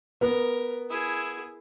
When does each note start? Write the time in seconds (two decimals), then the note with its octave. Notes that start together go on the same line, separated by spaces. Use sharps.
0.21 B3 A#4
0.90 E4 G#4